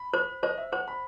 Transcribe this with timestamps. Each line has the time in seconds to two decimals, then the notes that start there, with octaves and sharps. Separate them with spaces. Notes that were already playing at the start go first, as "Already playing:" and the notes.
Already playing: B5
0.14 C5
0.43 C5 D#5
0.58 E5
0.72 C5 F#5
0.88 B5